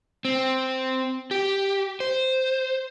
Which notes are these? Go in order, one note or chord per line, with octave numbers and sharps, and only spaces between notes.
C4
G4
C5